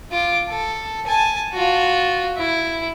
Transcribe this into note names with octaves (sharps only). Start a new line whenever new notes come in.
F4 D6
A4
G#5 A5
F4 F#4
E4